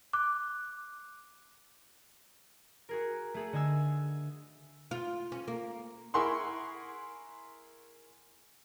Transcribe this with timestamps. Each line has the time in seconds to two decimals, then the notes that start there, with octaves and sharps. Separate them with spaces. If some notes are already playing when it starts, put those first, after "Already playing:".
0.13 D6 F#6
2.89 F#4 G#4 A#4
3.34 A3 G#4 A4
3.53 D3 D#5 G#5 E6
4.91 F4
5.32 C#4
5.48 A#3
6.14 E4 G#4 A#4 F#5 C6 C#6